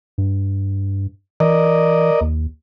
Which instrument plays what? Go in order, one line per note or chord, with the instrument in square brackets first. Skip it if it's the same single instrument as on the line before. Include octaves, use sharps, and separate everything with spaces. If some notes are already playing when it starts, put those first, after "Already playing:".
[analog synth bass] G2
[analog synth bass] E3 [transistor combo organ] A#4 D5 D#5
[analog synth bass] D#2